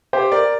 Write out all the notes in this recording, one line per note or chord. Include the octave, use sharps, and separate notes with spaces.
G4 C5
A#4 D5